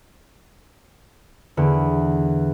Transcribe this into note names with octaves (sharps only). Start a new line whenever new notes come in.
E2 D3 B3